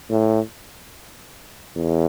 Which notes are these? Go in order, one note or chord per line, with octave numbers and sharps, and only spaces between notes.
A2
E2